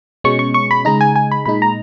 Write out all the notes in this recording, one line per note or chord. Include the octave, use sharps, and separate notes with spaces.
B2 G#3 C#4 C#6
C#6
C#6
B5
C#3 G#3 D#4 A#5
G#5
G#5
B5
A#2 G#3 D#4 B5
A#5